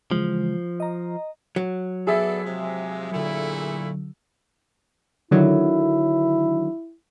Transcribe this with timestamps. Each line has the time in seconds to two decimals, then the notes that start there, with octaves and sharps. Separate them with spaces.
0.11 C#3 E3 F3 G#3
0.80 D#5 A#5
1.56 F#3
2.07 B3 G#4 A4 D5 E5
2.43 C3 F3 G#3
3.11 A#2 D3 F#3 A3 E4
5.31 D3 D#3 F#3 E4